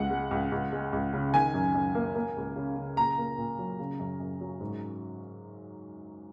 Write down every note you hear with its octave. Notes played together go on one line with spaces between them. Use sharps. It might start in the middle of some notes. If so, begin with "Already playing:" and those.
Already playing: C#2 G#3 F#5
G#3
C#2
C#2
G#3
C#2
C#3
D#3 G#5
F#2
F#2
A#3
A#3
C#2
C#3
C#3
A#2 A#5
A#3
A#2
F#3
C#3
F#2
F#2
F#3
G#2